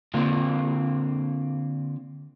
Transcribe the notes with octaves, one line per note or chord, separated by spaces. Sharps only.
D3 A#3 C4 D4 F4